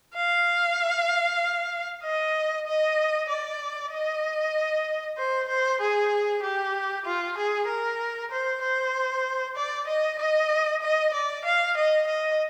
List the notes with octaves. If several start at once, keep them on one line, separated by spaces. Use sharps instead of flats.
F5
D#5
D#5
D5
D#5
C5
C5
G#4
G4
F4
G#4
A#4
C5
C5
D5
D#5
D#5
D#5
D5
F5
D#5
D#5